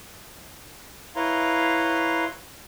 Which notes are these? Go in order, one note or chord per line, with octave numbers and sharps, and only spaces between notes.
E4 B4 C#5 F5 A#5 C6